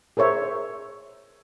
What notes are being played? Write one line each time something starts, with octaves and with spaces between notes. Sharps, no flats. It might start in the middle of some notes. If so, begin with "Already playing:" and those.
G#4 A#4 C5 C#5 E5